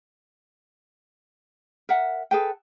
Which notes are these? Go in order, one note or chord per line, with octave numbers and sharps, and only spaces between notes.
A#4 E5 F#5
G#4 A4 B4 G5